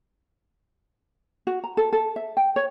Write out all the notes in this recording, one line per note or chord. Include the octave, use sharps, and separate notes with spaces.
F#4
A#5
A4
A4
E5
G5
C#5